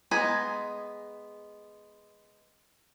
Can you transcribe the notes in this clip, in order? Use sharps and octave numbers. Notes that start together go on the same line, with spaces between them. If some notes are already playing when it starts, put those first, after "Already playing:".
G#3 B3 G#5 A#5 B5